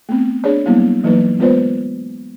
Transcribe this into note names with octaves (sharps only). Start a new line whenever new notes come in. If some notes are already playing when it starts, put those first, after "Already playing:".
A3 B3 C4
D4 G#4 C#5 D5
F#3 G3 A#3 B3 E4
E3 F#3 A#3 D#4 B4
G#3 B3 F4 B4 C5 D5